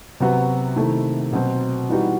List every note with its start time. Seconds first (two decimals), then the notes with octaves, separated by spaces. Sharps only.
0.20 C3 F#3 B3 F#4
0.76 C3 D#3 A3 E4
1.32 B2 F#3 C4
1.89 E3 G3 B3 D#4 F#4